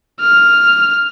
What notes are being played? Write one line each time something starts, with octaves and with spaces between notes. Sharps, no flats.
F6